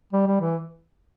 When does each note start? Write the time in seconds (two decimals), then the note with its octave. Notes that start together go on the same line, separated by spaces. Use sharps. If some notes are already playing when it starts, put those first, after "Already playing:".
0.13 G3
0.27 G3
0.41 E3